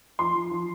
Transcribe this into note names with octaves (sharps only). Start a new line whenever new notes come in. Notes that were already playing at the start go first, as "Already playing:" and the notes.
F3 C6
F3
F3